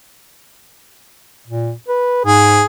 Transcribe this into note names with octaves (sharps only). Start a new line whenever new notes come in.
A#2
B4
G#2 G#4